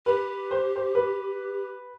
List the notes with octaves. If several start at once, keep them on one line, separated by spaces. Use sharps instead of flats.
G4 B4
C5
C5
B4